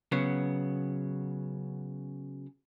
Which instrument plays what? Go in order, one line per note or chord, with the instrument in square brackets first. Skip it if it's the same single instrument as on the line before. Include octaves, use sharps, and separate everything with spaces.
[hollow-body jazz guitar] C#3 F#3 B3